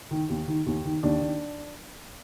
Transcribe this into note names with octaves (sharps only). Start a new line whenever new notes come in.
D#3
D#2
D#3
D#2
D#3
D#2 D4
D#3